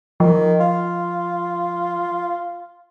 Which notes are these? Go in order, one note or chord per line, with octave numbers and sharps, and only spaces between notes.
D#3 F3
F4